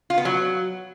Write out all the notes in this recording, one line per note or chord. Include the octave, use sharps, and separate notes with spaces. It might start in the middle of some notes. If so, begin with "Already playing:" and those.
F4
B3
F#3